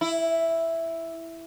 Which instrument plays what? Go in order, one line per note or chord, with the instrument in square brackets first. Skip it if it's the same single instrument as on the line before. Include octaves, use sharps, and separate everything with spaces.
[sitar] E4